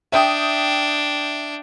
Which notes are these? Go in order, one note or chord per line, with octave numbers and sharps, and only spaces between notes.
D4 E5 G5 D#6